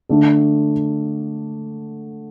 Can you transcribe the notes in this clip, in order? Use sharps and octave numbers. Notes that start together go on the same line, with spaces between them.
D3 A3 D4 A4